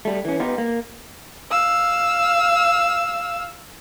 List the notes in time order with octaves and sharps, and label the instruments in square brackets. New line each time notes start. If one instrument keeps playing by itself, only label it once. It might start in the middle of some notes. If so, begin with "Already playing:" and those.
[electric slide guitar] G3 A3
E3 C#4
B3 D#4 F4 G4
A#3
[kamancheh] F5 E6